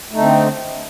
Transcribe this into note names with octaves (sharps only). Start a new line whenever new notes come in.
D3 A3 C4 D#4